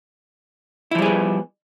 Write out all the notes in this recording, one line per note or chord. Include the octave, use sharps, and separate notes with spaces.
F3 G3 B3 E4 G#4